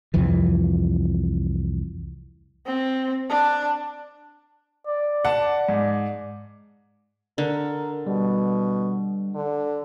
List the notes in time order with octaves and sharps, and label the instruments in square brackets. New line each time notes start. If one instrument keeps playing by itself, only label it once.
[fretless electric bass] C2 F2 E3 F3
[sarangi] C4
D4
[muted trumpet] D5
[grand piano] F#5 A5
G#2
[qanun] D3 [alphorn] A#4
[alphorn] B2 [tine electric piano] G3
[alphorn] D3